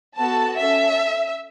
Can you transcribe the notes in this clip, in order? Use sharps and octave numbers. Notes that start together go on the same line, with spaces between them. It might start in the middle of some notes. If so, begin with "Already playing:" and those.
B3 F#4 A4 A5
C#4 A4 E5